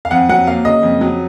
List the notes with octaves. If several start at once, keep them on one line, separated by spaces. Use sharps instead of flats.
F5
F2 F#5
F#3 F#5
A#3 F5
C#3 D#5
F2
F#3